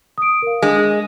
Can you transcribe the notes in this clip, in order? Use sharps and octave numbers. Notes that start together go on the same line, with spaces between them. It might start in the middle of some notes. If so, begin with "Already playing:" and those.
D#6 D7
A#4 F5
G#3 D4